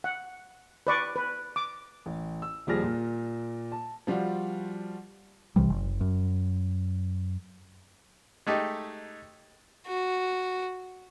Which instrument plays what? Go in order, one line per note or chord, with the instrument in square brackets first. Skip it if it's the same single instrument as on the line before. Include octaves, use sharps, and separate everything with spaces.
[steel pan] F#5
B4 D5 C#6
B4
D6
[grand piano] A1
E6
D#1 F3 G3 G#4 F6 A#6
A#2
A5
[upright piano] F3 G3 F4 F#4
[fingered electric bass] C2 C3 E3 G3
F#1
F#2
[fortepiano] G#3 A3 D#4 G4
[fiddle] F#4